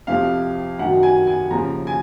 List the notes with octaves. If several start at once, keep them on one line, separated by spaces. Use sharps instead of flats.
F2 C3 F3 F5
F#2 D#3 F#3 F#5
G#5
G#5
D#2 C#3 F3 A#5
G#5